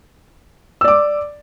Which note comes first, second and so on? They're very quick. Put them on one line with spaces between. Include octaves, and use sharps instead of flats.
E6 D5 D6